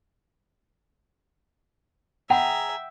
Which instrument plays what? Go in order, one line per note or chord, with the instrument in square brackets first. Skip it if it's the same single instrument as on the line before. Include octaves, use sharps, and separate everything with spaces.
[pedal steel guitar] G#4 A#5 [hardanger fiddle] E5 [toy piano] F#5 B5 [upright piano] G5